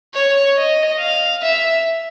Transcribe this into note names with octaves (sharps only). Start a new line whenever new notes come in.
C#5
D#5
F5
E5